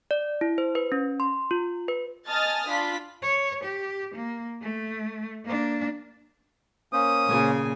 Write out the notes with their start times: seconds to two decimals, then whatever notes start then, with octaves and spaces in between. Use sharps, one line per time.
0.11 D5
0.41 E4
0.58 C5
0.75 B4
0.92 C#4
1.20 C6
1.51 F4
1.88 B4
2.27 D#5 G#5 A5 D#6 F6 A6
2.67 D4 F4 B5 B6
3.22 C#5
3.64 G4
4.15 A#3
4.62 A3
5.45 A#3 D4
6.93 A#3 C#4 C5 D#6
7.27 A#2 C#3 G#5